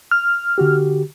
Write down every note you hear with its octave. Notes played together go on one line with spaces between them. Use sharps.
F6
D3 F#4 G4